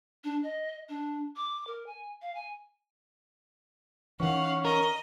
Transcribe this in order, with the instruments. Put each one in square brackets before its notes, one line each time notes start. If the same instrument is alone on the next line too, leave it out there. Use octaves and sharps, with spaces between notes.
[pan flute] D4
D#5
D4
D6
A#4
G#5
F5
G#5
[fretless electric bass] D#3 E3 [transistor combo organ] C#4 [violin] F5 F#5
[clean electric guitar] A#4 [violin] D#5